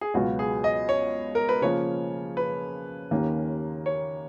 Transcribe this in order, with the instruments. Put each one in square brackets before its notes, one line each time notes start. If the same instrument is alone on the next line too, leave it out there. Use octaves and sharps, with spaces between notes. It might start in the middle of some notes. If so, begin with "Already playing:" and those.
[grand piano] G#4
[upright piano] C#2 B2 F#3 B3 F4 [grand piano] F#4
[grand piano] G#4
D#5
C#5
A#4
B4
[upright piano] C#3 F3 A#3 [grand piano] C#5
[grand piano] B4
[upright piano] D#2 D#3 A#3 C#4
[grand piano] C#5